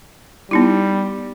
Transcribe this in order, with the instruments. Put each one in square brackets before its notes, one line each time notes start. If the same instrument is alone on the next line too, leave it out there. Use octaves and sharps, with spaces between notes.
[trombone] G3 [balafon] B3 D#4 E4